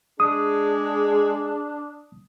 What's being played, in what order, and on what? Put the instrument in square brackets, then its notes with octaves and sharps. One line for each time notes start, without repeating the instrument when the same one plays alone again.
[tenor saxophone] G#3 [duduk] D4 [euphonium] G#4 [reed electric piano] D#6